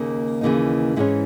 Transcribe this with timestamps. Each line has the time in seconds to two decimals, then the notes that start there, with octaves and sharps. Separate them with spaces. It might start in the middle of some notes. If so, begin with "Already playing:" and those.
Already playing: D#2 C#3 A#3 D#4
0.41 D#2 C#3 E3 A#3 D#4
0.96 G#2 E3 G#3 C#4 E4